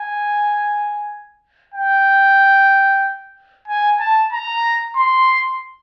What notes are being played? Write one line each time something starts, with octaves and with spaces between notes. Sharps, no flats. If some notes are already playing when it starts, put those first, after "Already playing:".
Already playing: G#5
G5
G#5
A5
A#5
C6